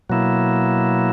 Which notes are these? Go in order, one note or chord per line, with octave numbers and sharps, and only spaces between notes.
B2 F#3 A#3 E4